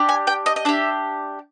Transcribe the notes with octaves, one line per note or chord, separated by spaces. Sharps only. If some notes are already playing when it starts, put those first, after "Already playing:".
Already playing: D4 G4
G#5
G5
D#5
D#5
D4 G4 E5